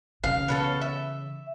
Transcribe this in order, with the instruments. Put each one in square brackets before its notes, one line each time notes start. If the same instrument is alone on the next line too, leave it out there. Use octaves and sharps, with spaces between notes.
[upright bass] C#3 E3 [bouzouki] F5
[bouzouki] B3 C#4 A4
E5